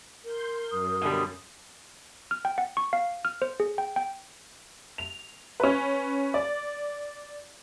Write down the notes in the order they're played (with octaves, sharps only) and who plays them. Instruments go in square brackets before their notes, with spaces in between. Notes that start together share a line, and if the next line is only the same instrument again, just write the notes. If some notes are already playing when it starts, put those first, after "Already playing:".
[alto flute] A#4 [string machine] C6 G6
[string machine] F#2 [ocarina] D#6
[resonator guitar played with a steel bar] B2 D3 G3
[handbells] F6
G5
F#5
C#6
F5
F6
C5
G#4
G5
G5
[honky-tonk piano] F7
C#4 B4
D5